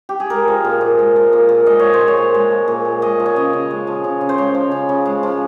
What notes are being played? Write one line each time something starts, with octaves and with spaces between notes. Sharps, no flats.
G4
G#4
G#3 A#4
F3
A#2
A#2
G#3
F3
A#2
A#2
G#3 D#5
F3 C#5
C5
A#2
C#5
A#2
G#3
F3
A#2
A#2
G#3 D#5
F3
C#5
C#3 D#5
C#3
G#3
F3
C#3
C#3
C5
G#3 C#5
F3
C#3
C#3
G#3
F3